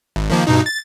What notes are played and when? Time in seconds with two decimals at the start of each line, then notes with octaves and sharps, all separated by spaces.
0.16 G#1
0.30 D#3 F3 A#3
0.47 G2 B2 D#4
0.66 A6